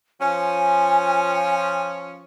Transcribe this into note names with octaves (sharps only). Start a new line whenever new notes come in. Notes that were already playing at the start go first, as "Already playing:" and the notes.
F3 C#4 G#5